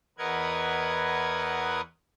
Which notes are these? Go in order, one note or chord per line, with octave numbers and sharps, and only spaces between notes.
E2 A#4 B4 D#5 F#5 G#6